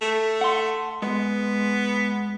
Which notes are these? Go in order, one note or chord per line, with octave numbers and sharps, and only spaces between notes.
A3
F#5 C6
G#3 B3